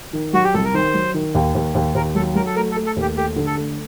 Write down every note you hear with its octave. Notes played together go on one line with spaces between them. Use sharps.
D#3
F#3 F#4
G4
C2 A4
A#4
D#3 C5
F#3
D#3
D#2
D#2
D#2
D#2 A#4
F#3 A4
F#3 A#4
A4
A3 A#4
A4
A3
A4
D#2
G4
A3 G4
D3
A4
A3